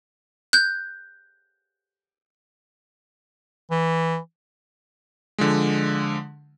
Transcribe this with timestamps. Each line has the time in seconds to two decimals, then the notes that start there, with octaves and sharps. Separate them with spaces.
0.53 F#6 G6
3.71 E3
5.38 D3 F3 G#3